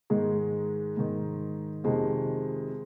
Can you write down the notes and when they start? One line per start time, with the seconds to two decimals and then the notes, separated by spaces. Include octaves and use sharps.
0.10 G#2 D#3 G#3
0.97 G#2 D#3
1.84 F2 C3 D#3 G#3